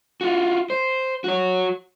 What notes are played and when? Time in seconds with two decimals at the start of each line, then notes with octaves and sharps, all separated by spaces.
0.21 F4 F#4
0.70 C5
1.24 F#4 C#5